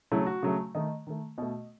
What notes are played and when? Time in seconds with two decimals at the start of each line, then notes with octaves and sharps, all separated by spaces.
0.12 C#3 F#3 A3 E4
0.26 F#4
0.43 C#3 F#3 A3
0.75 D#3 A3 D#5
1.07 D#3 A3
1.38 B2 A3 D#5